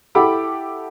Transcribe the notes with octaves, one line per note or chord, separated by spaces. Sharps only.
E4 G4 A4 F#5 B5 D6